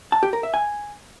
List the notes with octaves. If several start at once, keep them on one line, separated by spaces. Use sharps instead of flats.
A5
G4
A#4
E5
G#5